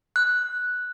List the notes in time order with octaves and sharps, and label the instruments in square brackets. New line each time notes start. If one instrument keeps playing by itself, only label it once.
[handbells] F#6